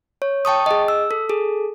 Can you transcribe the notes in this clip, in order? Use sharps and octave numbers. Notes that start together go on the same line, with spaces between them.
C#5
G5 A5 C#6 D#6
G#4 D#5
E6
A4
G#4 A4